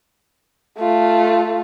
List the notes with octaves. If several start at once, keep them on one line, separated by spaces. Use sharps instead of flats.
A3 F4